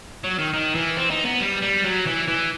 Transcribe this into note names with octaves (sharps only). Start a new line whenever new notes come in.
F#3
D#3
D#3
E3
C4
D#4
B3
G3
G3
F#3
E3
E3